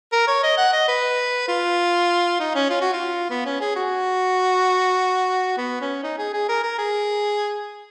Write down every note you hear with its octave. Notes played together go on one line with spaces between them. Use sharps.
A#4
C#5
D#5
F#5
D#5
B4
F4
D#4
C#4
F4
F#4
F4
B3
C#4
G#4
F#4
B3
C#4
D#4
G#4
G#4
A#4
A#4
G#4